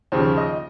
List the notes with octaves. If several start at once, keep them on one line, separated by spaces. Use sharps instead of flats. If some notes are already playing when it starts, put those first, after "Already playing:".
D#2 C#3 F3 C5
D#5